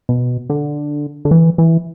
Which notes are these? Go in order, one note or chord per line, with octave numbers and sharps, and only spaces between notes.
B2
D3
D3
E3
E3